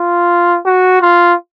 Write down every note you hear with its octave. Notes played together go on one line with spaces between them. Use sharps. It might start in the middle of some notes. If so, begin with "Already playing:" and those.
Already playing: F4
F#4
F4